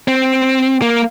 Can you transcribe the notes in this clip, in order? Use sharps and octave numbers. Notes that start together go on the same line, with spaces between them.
C4
A#3